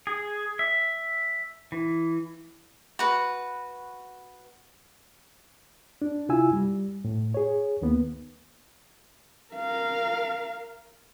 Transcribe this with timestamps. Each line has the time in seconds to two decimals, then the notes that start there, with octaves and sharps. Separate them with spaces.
0.07 G#4
0.59 E5
1.72 E3
2.99 F#4 B4
6.02 D4
6.29 C3 E4 F4 G#5 E6
6.53 G3
7.05 A2
7.34 G#4 C#5
7.81 D2 D#3 A#3 B3
9.54 A#4 F5